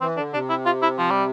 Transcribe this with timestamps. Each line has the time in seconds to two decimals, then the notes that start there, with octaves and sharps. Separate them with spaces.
0.01 E3 C4
0.17 D3 D4
0.33 C3 D4
0.49 E4
0.66 F4
0.82 E4
0.98 F3
1.11 G3